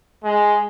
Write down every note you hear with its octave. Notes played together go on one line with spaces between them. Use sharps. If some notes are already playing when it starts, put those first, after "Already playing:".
G#3